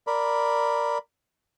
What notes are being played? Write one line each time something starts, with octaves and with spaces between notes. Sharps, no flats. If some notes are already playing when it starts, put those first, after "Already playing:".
A#4 D5 B5